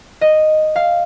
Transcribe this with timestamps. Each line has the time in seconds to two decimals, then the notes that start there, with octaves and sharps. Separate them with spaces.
0.21 D#5
0.76 F5